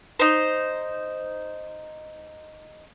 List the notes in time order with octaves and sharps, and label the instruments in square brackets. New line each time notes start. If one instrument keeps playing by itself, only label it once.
[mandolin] D#4 C5